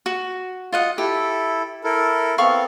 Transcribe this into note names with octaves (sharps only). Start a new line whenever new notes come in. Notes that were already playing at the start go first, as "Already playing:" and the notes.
F#4
F4 D#5 F#5
E4 G4 A4
E4 A4 A#4
B3 C4 A4 F5 B5 C#6